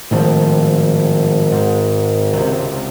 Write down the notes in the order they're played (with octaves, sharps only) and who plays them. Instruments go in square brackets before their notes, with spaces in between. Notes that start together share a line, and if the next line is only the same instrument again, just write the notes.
[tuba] G#1 [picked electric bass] A2 D#3 F3
[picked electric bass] G#2
C#2 C3